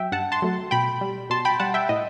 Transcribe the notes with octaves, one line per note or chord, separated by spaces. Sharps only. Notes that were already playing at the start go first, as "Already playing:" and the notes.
Already playing: F#3 E5 G5
G2 F#5 A5
A5 C6
F#3 A3
B2 G5 B5
G3
B2 A5 C6
G5 B5
G3 F#5 A5
E5 G5
A2 D#5